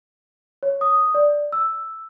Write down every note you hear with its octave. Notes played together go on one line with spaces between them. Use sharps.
C#5
D#6
D5
E6